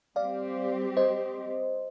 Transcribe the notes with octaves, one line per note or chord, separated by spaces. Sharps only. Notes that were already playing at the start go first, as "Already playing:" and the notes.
G3 C4 G4 D5 F5
C5 D#5